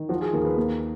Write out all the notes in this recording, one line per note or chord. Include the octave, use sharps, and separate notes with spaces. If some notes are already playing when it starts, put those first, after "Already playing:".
Already playing: D#3
F3 F#4
G#4
D#2 A#4
B4
A#3